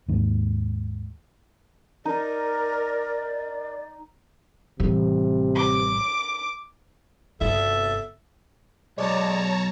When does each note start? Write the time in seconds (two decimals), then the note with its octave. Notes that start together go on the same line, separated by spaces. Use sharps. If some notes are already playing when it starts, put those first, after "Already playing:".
0.09 D#2 G#2
2.05 D#4 A#4 D5
4.80 A1 C3 G3
5.54 D6
7.41 G1 C3 A4 E5
8.98 B1 G#3 C#5 D5 A5 A#5